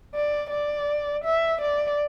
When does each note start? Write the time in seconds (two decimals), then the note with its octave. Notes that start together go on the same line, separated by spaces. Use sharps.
0.15 D5
0.51 D5
1.25 E5
1.61 D5